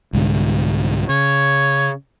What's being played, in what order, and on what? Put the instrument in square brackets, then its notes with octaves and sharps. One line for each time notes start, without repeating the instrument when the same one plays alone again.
[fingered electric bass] C2 G#2 D3
[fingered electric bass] C#3 [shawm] C#5